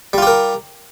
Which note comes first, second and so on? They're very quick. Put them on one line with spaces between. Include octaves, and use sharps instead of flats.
G3 F4 G4 A#4